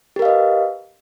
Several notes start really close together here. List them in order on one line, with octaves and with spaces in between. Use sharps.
G4 A#4 F5 D#5 B4